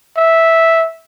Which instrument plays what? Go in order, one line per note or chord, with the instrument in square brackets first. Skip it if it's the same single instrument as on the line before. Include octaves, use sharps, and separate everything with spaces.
[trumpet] E5